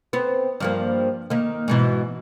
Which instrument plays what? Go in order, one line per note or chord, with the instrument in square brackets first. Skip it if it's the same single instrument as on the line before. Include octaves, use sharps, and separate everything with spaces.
[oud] B3 C4
G2 F3 A#3
D#3 A#3
G#2 B2 E3